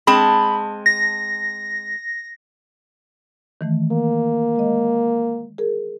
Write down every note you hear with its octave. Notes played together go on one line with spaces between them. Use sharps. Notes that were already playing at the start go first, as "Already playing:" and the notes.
G#3 C4 A5 B5
A#6
D#3 E3 A3
A#3
G#3 D#5
G#4 A#4